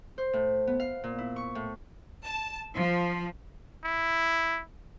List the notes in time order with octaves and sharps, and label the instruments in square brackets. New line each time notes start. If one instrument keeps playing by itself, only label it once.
[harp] C5
A2
B3
F5
A#2
E4
C#6
A2
[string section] A5
F3
[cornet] E4